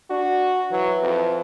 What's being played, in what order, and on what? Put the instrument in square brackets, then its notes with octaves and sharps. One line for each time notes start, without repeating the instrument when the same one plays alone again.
[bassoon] D4 [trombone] F#4
[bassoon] E3 [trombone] F#3
[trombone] F2